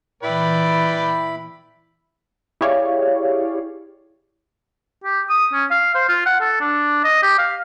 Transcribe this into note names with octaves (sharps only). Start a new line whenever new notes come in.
A#2 E3 E4 B4 D5 G5 B5
E4 G4 G#4 C#5 D5 F5
G4
D#6
C#4
F5
C5
F4
F#5
A4
D4
D#5
G4
F5